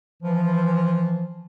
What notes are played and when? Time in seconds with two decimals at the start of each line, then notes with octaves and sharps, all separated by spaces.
0.23 E3 F3